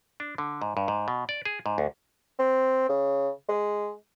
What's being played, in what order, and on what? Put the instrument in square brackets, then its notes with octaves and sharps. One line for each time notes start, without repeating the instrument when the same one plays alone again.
[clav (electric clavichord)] D4
D3
G#2
G2
G#2
B2
D5
G#4
G#2
D2
[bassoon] C4
C#3
G#3